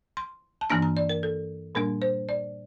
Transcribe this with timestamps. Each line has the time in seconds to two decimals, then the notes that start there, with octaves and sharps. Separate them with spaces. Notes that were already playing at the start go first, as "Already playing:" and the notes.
0.17 C6
0.61 A5
0.70 G2 E3 A#3 D4 A#5
0.82 A#5
0.97 D5
1.09 A#4
1.23 A4
1.75 A#2 G3 A#3 D4 A#4
2.02 C5
2.29 D5